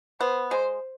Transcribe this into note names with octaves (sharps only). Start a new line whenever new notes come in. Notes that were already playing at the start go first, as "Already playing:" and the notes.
B3 C5
G#3 C5